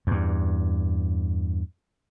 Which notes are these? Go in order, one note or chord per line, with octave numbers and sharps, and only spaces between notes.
E2 G2